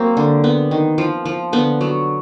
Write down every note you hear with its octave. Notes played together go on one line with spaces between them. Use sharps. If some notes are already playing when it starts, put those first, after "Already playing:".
Already playing: F#3 A#3 C4
D3
B3
D#3
F3
F3
D3 B3
F#3